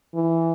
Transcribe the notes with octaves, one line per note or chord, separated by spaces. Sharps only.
E3